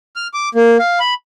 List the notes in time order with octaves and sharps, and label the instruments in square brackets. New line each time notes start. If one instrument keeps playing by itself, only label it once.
[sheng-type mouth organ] F6
D6
A#3
F5
B5